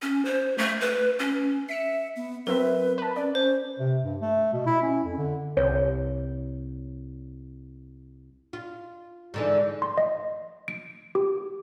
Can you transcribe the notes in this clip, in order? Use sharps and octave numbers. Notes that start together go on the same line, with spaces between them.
C#4
C5
A3
B4
C#4
E5 B6 C#7 E7
B3
F#3 C4 A#4 B4 E5
B4 A5
C#4 D5
C#4 C5
C3
G2
A3
B2
E4
C#4
F2
D3
C2 C#5
F4
G#2 D3 E3
C6
D#5
D7
G4